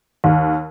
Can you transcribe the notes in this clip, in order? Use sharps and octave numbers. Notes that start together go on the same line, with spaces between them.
D#2